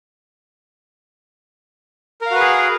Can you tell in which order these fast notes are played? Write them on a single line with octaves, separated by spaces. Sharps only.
A#4 F5 F#4 B4 G#4